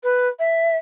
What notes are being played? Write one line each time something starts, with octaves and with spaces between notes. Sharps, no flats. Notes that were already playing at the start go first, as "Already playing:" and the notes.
B4
E5